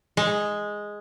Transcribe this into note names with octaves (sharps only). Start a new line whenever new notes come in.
G#3